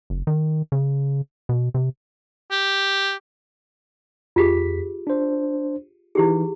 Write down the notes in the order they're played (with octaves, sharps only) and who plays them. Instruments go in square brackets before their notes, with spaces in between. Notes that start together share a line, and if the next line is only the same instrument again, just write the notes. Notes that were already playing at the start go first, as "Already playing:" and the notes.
[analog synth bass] F#1
D#3
C#3
B2
C3
[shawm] G4
[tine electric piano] F2 B6 [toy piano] F4 G4 G#4
[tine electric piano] D4 C5
[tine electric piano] E3 D#4 [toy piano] E4 G4 G#4